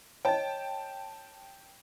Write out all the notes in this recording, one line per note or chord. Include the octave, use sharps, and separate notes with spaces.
C#5 D#5 G5 A5